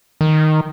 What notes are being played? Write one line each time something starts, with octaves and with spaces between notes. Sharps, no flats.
D#3